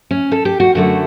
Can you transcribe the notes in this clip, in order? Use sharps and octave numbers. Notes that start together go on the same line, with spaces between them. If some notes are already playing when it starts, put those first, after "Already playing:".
C#4
A4
G4
F#4
F#2 D3 A3 F#4